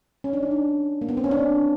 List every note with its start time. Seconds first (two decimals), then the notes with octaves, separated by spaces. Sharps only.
0.24 C#4
0.33 D4
0.43 D#4
0.51 D4
1.01 A#3
1.09 B3
1.17 C4
1.24 C#4
1.31 D4